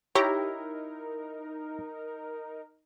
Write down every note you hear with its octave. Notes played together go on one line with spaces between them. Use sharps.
D#4 E4 G4 A#4 C#5 A#5